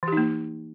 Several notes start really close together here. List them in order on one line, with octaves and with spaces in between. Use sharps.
E3 G4 D#4 A#3